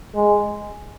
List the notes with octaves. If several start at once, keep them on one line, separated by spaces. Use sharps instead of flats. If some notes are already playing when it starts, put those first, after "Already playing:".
G#3